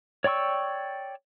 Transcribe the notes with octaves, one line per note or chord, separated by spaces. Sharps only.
C#5 D5 G5 C#6 E6